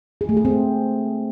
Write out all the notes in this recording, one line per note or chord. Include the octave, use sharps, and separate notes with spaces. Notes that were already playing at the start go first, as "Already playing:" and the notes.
G#4
A3
G#4
C4